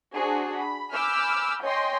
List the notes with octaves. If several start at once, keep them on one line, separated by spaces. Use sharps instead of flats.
D4 F#4 G#4 C5
B5
G#5 B5 D6 E6 F6 G6
C#5 D#5 G5 G#5 C6